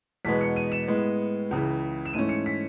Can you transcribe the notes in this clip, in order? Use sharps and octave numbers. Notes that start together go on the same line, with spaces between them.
E2 B2 G#3 B3 B6
C#7
D#7
E7
A2 G#3 B3
C#2 C#3 E3
E7
G#2 E3 A3 C#4 D#7
C#7
B6